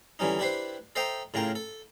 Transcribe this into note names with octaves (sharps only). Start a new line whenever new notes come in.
D3 E3 G3 C#4 D#4
D4 E4 G4 B4 C5
A4 C5 D#5 E5 G5 A#5
A2 C#3 F4 A#4 G5
A4